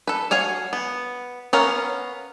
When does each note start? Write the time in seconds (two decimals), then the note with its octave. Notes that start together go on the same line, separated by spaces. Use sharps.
0.07 A4 B4
0.31 F#4 C#5 F5 G#5
0.73 B3
1.53 B3 C#4 A#4 F5